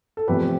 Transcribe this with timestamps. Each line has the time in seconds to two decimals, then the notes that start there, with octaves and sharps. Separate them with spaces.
0.17 A4
0.28 E2 C3 F3 A3 C4 G4 B4